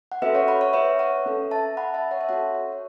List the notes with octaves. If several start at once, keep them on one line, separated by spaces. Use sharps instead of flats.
F#5
C#4 F#4 A4 B4 E5
C#5 F#5
F#5 B5
C#5
B4 E5
C#5 F#5
C#4 A4
E5 A5
F#5 B5
E5 A5
C#5 F#5
E5
C#4 F#4 A4 C#5 F#5
C#5
C#5